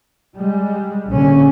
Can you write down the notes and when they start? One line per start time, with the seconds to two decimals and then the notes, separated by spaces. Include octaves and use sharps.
0.35 G3 G#3
1.09 A#1 D3 C#4